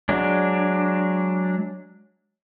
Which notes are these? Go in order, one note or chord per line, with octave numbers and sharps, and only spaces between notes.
F#3 G#3 D4